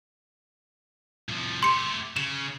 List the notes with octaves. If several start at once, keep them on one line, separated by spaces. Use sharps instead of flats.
C2 F3
A3 G4 C6 C#7
C#3 E7